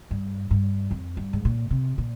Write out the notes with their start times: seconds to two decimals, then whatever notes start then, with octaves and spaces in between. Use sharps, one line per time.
0.11 G2
0.50 G2
0.91 F2
1.17 G2
1.33 G#2
1.45 A#2
1.70 C3
1.98 A#2